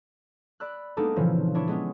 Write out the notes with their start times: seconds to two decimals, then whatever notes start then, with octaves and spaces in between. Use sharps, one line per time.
0.60 D5 B5 E6 F#6
0.97 G#3 A#3 B3 D4 D#4 A4
1.16 A#2 C#3 E3 F3 C4
1.55 D4 E4 C#5
1.68 G#3 B3 C#4